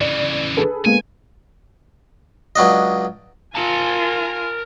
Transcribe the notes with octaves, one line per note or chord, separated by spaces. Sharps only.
C#3 E3 D5
G#4 A4 B4
G#3 A#3 B3 G#5
C#2 F#3 D4 D#5
F4 A#4 G#5 A5